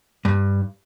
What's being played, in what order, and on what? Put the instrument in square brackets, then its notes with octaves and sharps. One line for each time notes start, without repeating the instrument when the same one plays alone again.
[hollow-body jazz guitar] G2